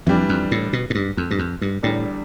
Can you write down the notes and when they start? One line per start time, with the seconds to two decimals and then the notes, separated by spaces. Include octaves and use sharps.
0.06 F2 E3 G3 D4
0.29 F2
0.51 A2
0.73 B2
0.90 A2
0.95 G2
1.17 F2
1.31 G2
1.39 F2
1.61 G2
1.83 E2 A2 D3 G3